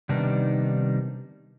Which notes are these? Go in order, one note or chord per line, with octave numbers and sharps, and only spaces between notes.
C3 D#3 G3 B3 D4 D#4